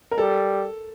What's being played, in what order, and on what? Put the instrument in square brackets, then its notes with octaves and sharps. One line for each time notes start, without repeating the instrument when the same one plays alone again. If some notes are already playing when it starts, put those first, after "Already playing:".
[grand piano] A#4
[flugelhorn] G3 [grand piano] A4